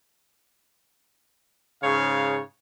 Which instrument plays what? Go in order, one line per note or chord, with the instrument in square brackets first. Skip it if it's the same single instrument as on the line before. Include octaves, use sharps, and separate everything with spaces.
[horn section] G#2 C#3 C#5 F5